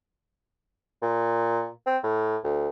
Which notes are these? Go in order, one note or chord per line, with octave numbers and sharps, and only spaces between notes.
A#2
C4
A2
D2